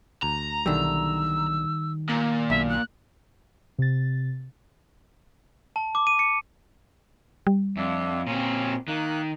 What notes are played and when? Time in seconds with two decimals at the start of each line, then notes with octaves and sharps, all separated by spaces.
0.23 D2 A#5
0.66 B1 D3 D#3 G3 E4 E6
2.09 A#2 A#5
2.50 B1 E5
2.69 F#6
3.79 C3 A6
5.76 A5
5.95 D6
6.07 D#7
6.19 C#7
7.47 G3
7.77 F2 D4 E5
8.27 A#2 C4 C#4 A#5 C6
8.88 D#3 A#3 F#6